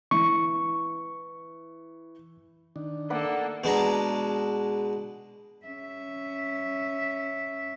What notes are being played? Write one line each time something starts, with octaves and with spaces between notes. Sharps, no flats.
E3 C#6
D#3 D4
A#3 A4 D5 F#5 B5
B2 G#3 D4 A#5
C#4 E5